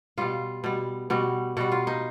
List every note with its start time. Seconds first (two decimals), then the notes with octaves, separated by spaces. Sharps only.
0.18 B2 G3 F4
0.64 B2 G3
1.10 B2 G3 F#4
1.57 B2 G3 F#4
1.72 F4
1.87 D#4